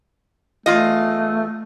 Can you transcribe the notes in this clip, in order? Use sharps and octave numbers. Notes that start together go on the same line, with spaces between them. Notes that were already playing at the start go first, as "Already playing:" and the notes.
E2 A3 F4 D#5